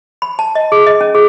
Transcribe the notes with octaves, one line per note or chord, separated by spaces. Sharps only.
B5
A5
D#5
G#4
D#5
C#4
G#4